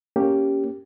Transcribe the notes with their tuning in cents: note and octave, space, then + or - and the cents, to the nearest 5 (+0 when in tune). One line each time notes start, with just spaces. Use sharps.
A#3 +0 C#4 +0 G4 +0